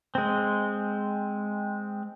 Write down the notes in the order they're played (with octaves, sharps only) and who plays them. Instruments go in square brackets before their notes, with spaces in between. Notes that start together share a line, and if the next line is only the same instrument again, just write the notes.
[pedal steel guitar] G#3 C4